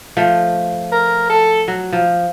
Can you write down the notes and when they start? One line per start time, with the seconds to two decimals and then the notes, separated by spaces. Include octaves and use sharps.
0.17 F3 A3
0.92 A#4
1.30 A4
1.68 F#3
1.93 F3